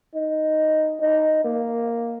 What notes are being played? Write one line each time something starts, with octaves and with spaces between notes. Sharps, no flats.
D#4
D#4
A#3